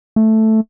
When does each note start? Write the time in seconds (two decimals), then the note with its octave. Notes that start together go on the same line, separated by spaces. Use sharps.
0.16 A3